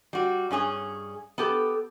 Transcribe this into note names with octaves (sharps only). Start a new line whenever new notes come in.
G3 F#4
G2 C#4 G#4 C#5
B3 G4 A4